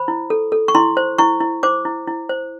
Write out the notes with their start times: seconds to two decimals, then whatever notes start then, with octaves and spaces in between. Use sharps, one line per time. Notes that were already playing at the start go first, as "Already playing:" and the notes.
Already playing: C5 B5
0.08 E4
0.30 A4
0.52 A4
0.68 C#6
0.75 E4 C6
0.97 C5
1.18 E4 C#6
1.41 E4
1.63 C5 D6
1.85 E4
2.08 E4
2.29 C5